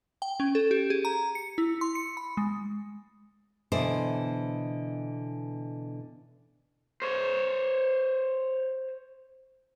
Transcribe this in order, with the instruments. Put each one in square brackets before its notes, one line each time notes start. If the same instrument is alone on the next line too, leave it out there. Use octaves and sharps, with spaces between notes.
[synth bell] G5
C#4
A4
G4
G#4
A#5
C#7
E4
C6
C#7
B5
G#3
[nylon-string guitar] B2 D3 E3 C5
[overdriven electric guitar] C5 C#5